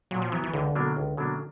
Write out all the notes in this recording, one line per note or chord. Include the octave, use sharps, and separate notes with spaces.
A#2 F#3
F3
E3 F#3 B3
E3
C#2 D3
B2 F#3 A#3 D4
C#2
B2 F#3 A#3 D4